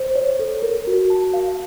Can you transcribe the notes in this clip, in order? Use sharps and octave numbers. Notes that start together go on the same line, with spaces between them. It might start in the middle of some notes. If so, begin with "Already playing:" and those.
Already playing: C5
C#5
A4
A#4
F#4
A5
F5